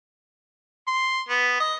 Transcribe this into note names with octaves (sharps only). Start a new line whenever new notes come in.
C6
B3
D#5